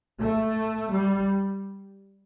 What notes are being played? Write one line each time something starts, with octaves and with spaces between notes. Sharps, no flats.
A3
G3